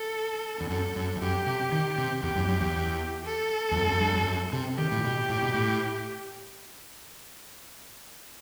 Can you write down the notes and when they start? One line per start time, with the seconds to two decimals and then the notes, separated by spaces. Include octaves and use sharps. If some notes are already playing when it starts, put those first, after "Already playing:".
Already playing: A4
0.60 E2
0.70 F#2 A4
0.96 F#2
1.16 E2
1.21 F#2 G4
1.46 C3
1.72 D#3
1.98 C3
2.23 E2 G4
2.36 F#2
2.49 F#2
2.61 E2
3.25 A4
3.71 E2
3.75 F#2
3.88 F#2
4.01 G2
4.14 F#2
4.26 F#2
4.53 C3
4.77 D#3 G4
4.92 A2
5.04 B2
5.29 A2
5.42 B2
5.54 A2